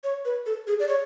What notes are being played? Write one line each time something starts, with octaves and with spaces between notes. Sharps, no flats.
C#5
B4
A4
G#4
D5
C#5